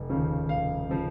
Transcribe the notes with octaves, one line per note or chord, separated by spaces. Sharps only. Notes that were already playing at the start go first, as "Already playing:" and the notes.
Already playing: F1
D#2 C#3 F3
F1 F5
C#3 F3